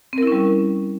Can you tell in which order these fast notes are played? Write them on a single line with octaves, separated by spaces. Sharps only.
C4 A#4 E4 C#4 G3